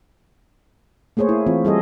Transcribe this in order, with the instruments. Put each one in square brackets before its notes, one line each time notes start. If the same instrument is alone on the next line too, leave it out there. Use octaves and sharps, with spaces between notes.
[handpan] A3 A#3 G#4 C5 C#5
E4
E3 C4 F4
G3 G#4 A4 D#5